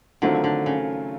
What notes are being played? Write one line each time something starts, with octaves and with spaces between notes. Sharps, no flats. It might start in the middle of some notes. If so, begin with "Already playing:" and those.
D3 D#3 F#3 A3 C4 F4
D3
C#3